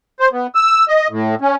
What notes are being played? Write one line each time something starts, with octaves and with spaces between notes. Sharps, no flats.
C5
B3
E6
D#5
A2
C#4